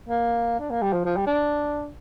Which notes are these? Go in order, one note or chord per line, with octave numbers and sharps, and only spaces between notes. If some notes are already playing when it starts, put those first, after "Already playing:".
A#3
D4
A#3
G3
F3
F3
G3
D4